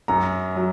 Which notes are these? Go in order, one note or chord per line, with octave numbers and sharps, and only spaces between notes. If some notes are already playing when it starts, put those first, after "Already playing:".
F#2 A#5
F#3